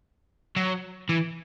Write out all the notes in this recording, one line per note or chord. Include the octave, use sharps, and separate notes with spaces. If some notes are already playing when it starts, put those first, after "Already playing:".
F#3
E3